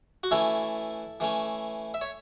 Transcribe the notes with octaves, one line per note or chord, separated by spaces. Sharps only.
F#4
E3 A3 C#4 E4 A4
E3 A3 C#4
E5
C#5